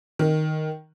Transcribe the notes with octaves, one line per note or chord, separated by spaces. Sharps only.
D#3